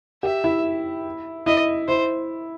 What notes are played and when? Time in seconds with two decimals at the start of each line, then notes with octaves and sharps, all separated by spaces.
0.23 G4 E5
0.44 E4
1.46 E4 D#5
1.88 E4 C5